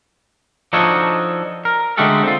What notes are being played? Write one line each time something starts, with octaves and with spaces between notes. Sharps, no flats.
F3 D4 D#4 F#4 A4 C#5
A#4
D3 G#3 A3 F#4 G4 A4
C4 F4